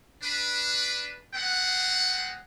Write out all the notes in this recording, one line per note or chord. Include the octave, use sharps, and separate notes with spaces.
D4 B4
G#3 B3 C4 F#5